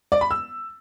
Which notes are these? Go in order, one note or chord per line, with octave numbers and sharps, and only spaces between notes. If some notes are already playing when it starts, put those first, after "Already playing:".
D5
B5
E6